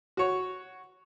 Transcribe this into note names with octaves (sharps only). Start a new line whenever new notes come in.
F#4 C#5